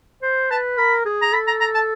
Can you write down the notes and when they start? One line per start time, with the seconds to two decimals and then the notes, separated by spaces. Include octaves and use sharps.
0.23 C5
0.51 B4 A5
0.78 A#4 B5
1.06 G#4
1.22 A#5
1.33 A4 B5
1.47 A#5
1.61 A#5
1.75 A5